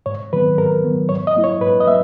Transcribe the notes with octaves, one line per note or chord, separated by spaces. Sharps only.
G#2 C#5
D#3 F#3 B3 B4
G#2 A#4
D#3 F#3 B3
G#2 C#5
D#5
F#3 A#3 E4
C#5
G#2 B4
D#5
F#3 A#3 E5